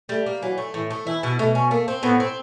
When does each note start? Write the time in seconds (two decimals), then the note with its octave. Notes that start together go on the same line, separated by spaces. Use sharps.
0.09 G3 A3
0.26 A#3
0.42 E3 F#3
0.58 A3
0.74 A2 E3
0.91 A3
1.06 E3 E4
1.23 B2
1.39 B2 A3
1.55 C#4
1.71 A3 A#3
1.88 C4
2.03 A2 B3
2.20 C4